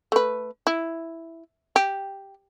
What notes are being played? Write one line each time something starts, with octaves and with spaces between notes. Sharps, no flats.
A3 B4
E4
G4